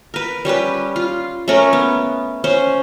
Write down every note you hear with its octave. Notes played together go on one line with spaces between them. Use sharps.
A#4 B4
G3 C#4 G4 B4
F4
A3 C#4 A#4
B3
C#4 C5